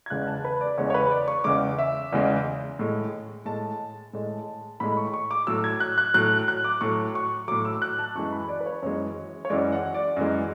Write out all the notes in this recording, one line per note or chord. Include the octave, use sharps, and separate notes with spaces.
G#6
E2 C#3 G#3 F#6
A5
B4
D5
E2 C#3 G#3 C#5
C#5
B4
D5
C#6
E2 C#3 G#3 D6
E5
E2 C#3 G#3
A2 G#3
A2 G#3 A5
A2 G#3
A2 G#3 B5
C#6
C#6
D6
A2 F#3 E6
G#6
F#6
F#6
A2 F#3 F#6
F#6
D6
A2 F#3 C#6
C#6
A2 F#3 D6
E6
F#6
A5
F#2 E3 G#3 C#6
B5
D5
B4
C#5
F#2 E3 G#3 C#5
C#5
F#2 E3 G#3 D5
F#5
D5
F#2 E3 G#3